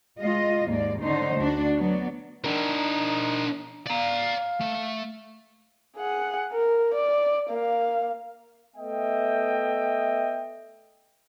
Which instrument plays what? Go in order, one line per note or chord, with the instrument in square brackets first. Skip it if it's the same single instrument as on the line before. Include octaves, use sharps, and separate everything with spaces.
[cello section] G#3 F4 D#5
D#2 G#2 A#3 D5
D3 C#4 D#4 C5
D2 D4 F#4
F#3 B3 D5
[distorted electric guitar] D4 A#4 [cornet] D#4
[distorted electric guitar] D5 A#5 [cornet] F5
[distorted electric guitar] A3
[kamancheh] G#4 F#5
A#4
D5
A#3 F5
[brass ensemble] A3 B3 D#5 E5 G5